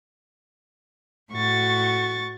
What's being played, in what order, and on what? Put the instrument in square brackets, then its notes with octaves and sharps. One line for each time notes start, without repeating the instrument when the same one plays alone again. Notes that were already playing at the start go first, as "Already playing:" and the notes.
[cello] A2 F#4 [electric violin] C#6 A6